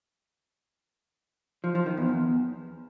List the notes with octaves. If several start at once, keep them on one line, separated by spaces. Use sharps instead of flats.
F3
F3
D#3
E2
E2